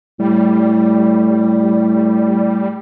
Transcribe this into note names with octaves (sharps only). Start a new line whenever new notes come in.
A2 G3